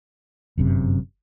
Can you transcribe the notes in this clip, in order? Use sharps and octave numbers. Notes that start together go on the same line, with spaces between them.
G1 F#2 C3